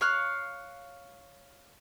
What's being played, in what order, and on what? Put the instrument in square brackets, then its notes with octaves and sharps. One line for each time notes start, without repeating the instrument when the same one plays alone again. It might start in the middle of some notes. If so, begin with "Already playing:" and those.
[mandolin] C#5 F5 F#6